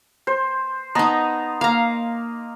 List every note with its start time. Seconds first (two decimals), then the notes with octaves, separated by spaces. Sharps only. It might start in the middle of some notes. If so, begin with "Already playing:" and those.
0.27 C5
0.95 B3 D#4 D#5 A5 A#5
1.61 A#3 F5 A#5